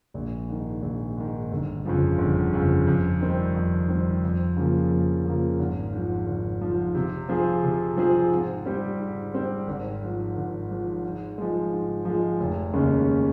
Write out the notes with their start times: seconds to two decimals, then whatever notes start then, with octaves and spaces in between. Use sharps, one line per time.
0.14 A#1
0.48 G#2 D#3
0.82 A#1
1.17 G#2 D#3
1.51 G1
1.85 F2 C#3 F3
2.18 G1
2.53 F2 C#3 F3
2.87 F2
3.20 D#3 G3 C4
3.54 F2
3.88 D#3 G3 C4
4.23 F2
4.56 C#3 F3 A#3
4.91 F2
5.24 C#3 F3 A#3
5.59 G#1
5.92 G#2 F3
6.26 G#1
6.61 G#2 F3
6.95 C3
7.29 F3 C4 F4 G#4
7.63 C3
7.97 F3 C4 F4 G#4
8.31 G#2
8.65 G3 C4 G4
8.99 G#2
9.34 G3 C4 G4
9.67 G#1
10.01 G#2 F3
10.36 G#1
10.69 G#2 F3
11.03 G#2
11.38 F3 G#3
11.72 G#2
12.05 F3 G#3
12.40 F1
12.73 D#2 C#3 G#3 C#4